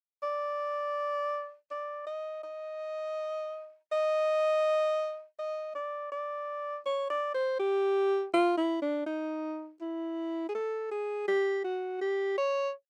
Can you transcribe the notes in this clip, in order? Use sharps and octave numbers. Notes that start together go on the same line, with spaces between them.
D5
D5
D#5
D#5
D#5
D#5
D5
D5
C#5
D5
C5
G4
F4
E4
D4
D#4
E4
G#4
A4
G#4
G4
F#4
G4
C#5